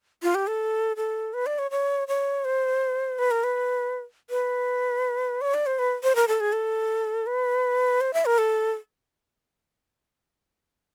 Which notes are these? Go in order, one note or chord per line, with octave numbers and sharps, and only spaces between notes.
F4
G4
A4
A4
B4
D5
C#5
C#5
C#5
C5
B4
A#4
B4
B4
C#5
D5
C5
B4
C5
A#4
A4
G#4
A4
B4
C5
E5
A#4
A4